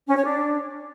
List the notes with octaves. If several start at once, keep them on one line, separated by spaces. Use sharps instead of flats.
C#4
C#5
D4